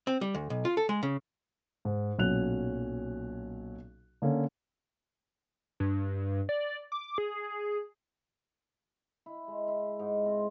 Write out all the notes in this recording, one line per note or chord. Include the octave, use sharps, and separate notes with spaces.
C4
G3
D2
B1
F4
A4
G#3
C#3
G#2
B1 A#2 F#3 C#4 F#6 F7
D3 A#3 C#4 A4
G2
D5
D6
G#4
E4
G#3
E4
G#2
C4